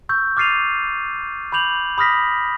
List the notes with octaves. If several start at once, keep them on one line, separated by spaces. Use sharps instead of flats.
C#6 E6 G6
D6 F6 A6 C7 D#7 F7
B5 D6 G6 F7 F#7
B5 D#6 F6 A#6 B6